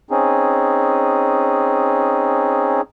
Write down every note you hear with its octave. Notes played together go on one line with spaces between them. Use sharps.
C4 C#4 D#4 G#4